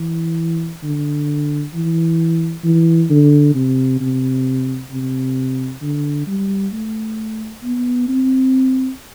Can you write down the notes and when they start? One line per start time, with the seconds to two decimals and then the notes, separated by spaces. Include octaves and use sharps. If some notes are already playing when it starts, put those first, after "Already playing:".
Already playing: E3
0.83 D3
1.74 E3
2.64 E3
3.10 D3
3.55 C3
4.01 C3
4.91 C3
5.82 D3
6.27 G3
6.73 A3
7.63 B3
8.08 C4